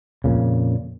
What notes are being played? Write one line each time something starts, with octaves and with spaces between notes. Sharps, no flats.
F2 A#2 C#3